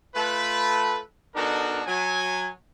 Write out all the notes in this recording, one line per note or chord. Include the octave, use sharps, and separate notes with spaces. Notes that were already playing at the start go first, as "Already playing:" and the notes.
A3 F4 A4 B4
B2 D4 D#4 F#4 A4 A#4
F#3 G#5